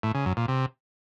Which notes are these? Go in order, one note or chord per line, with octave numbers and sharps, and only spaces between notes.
A2
C#3
F#2
A#2
C3